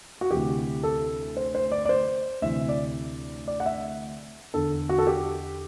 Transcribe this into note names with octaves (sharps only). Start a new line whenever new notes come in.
F#4
D2 C3 E3 G4
A4
C5
C5
D5
D5
C5
D2 C3 E3 E5
D5
D5
F#5
E5
E2 D3 A4
F#4
A4
G4